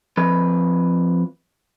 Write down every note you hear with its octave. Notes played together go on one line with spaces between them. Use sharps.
F2 B4